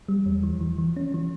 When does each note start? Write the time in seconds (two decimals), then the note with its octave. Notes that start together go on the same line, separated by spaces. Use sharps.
0.08 G3
0.26 E2
0.43 E3
0.60 E3
0.78 E3
0.96 C#4
1.14 E3